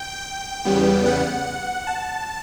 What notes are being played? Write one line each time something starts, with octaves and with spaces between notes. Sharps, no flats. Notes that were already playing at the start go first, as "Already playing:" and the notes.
Already playing: G5
E2 C#3 G3 B3
F#5
A5